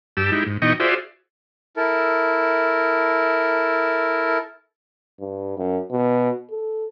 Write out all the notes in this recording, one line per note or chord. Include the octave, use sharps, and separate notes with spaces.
G2 G4 A5 E6
G#3 D#4 E4 G4
G#2
B2 E3 D#4 D#5 G5 C#6
F4 F#4 G#4 C5 D5 E5
E4 A4 A#4
G2
F#2
B2
A4